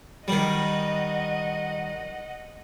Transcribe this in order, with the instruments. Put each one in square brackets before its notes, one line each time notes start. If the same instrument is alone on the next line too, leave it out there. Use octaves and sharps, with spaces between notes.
[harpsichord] D#3 G3 [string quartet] D#5 F#5